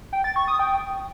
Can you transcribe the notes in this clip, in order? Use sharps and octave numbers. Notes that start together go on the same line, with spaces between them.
G5
A6
C#6
D#6
G5